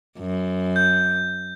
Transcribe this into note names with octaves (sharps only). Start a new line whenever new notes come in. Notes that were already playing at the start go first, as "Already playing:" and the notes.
F#2
G6